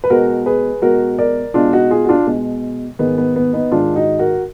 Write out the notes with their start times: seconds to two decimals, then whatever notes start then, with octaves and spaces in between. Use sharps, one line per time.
0.04 B4
0.10 B2 G#3 F#4 A#4
0.46 G#4 B4
0.82 B2 G#3 F#4 A#4
1.18 A#4 D5
1.54 B2 G#3 D4 F4
1.73 D#4 F#4
1.91 F4 G#4
2.05 F#4
2.09 D4 F4
2.27 B2 G#3
2.99 G#2 D#3 G#3 B3
3.18 B3
3.36 B3
3.53 B3 D#4
3.72 G#2 D#3 G#3 D4 F4
3.96 D#4 F#4
4.19 F#4 A#4